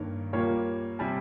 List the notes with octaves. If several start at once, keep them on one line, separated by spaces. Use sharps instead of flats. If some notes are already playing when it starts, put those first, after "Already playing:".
Already playing: G2 D#3 A#3 C#5
A#2 G3 A#3 C#5
C3 G3 G#5